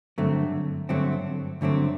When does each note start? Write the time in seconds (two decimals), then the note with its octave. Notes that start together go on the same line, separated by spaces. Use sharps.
0.18 G2 D3 F#3 A3 C4
0.89 G2 D3 F#3 A3 C4
1.61 G2 D3 F#3 A3 C4